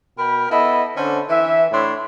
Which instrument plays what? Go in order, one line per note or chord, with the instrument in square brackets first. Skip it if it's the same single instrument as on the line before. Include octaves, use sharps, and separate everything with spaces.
[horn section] B2 A#4 G5 B5
B3 E4 A4 D#5 B5
D3 C#4 D4 A4 C5
E3 E5
A2 D4 C#5 B5 C6